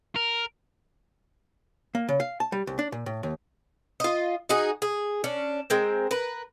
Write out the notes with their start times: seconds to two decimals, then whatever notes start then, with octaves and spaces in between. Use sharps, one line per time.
0.16 A#4
1.95 A#3
2.09 C#3
2.20 F5
2.40 A5
2.52 G3
2.67 C2
2.79 D4
2.92 A#2
3.06 A2
3.23 D#2
4.00 F4 D#5
4.49 D#4 F#4 G#4
4.82 G#4
5.24 C#4 D4
5.70 G#3 C4 A#4
6.11 A#4 B4